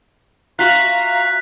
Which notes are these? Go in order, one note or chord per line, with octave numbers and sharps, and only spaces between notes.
F4 F#4 E5 F5 A#5 F#6 B6